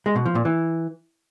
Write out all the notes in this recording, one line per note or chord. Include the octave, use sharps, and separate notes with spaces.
G#3
B2
F3
A#2
E3